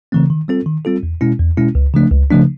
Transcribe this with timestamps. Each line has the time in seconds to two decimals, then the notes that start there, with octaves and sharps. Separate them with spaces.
0.12 C#3 E3 A3 C4
0.30 D#3
0.48 G3 C4 F4 A4
0.66 D#3
0.85 G3 C4 F4 A4
1.03 E2
1.21 B2 G#3 C#4 E4
1.40 E2
1.57 B2 G#3 C#4 E4
1.75 C#2
1.94 C#3 F3 A3 D4
2.12 C#2
2.30 C#3 F3 A3 D4